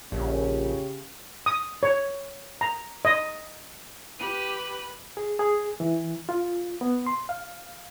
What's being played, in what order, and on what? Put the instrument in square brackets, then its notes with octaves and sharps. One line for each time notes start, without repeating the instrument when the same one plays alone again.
[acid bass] A#1 [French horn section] C#3 C#4 G4
[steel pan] D#6
C#5
A#5
D#5
[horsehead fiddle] G4 [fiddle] B4 [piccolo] D#7
[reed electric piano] G#4
G#4
E3
F4
B3
C6
F5